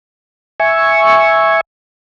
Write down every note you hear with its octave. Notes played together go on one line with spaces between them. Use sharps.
E5 G#5 C#6